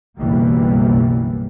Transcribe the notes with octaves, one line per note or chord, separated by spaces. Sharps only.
F#1 B1 F#2 E3 G3 A#3